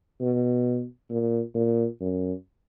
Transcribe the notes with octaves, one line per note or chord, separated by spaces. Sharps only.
B2
A#2
A#2
F#2